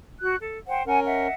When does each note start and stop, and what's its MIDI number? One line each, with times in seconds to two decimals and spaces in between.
0.20 0.36 66
0.20 0.36 90
0.41 0.57 69
0.67 0.82 72
0.67 0.82 78
0.67 0.82 79
0.87 1.27 61
0.87 1.27 70
0.87 0.99 78
0.87 0.99 80
1.05 1.33 75
1.05 1.33 76
1.05 1.33 78